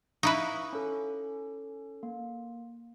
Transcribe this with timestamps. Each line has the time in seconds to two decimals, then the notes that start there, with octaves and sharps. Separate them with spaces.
0.23 D#4 E4 B4 F5 C#6
0.73 C#4 A4
2.03 A#3